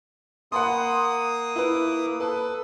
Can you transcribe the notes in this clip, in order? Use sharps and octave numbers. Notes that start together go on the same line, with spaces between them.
A#3 F#5 B5 C6 D#6
E4 B4
A4 B4